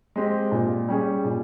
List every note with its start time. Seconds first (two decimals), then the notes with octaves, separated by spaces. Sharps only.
0.16 G#3 C4 G4
0.52 A#2
0.89 G3 C#4 G#4
1.25 A#2